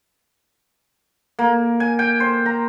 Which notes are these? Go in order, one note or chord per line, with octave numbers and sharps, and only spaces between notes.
A#3
G#5
G5
C5
A#5